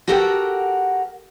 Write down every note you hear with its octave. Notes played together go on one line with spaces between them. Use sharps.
F#4 G4 A4 A#4 F#5 G5